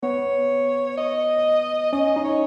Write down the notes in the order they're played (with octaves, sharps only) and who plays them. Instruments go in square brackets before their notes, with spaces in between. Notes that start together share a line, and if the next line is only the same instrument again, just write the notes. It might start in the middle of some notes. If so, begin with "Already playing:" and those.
[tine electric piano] B3 [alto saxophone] C#5
[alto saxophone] D#5
[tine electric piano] C#4 [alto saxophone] D#5
[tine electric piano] D#4
[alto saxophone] C#5